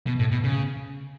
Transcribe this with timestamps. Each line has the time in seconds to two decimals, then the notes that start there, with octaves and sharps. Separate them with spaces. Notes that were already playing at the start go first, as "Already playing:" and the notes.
0.07 B2
0.19 A2
0.32 B2
0.44 C#3